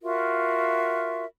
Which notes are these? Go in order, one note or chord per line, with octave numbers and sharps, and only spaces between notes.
F4 F#4 A#4 E5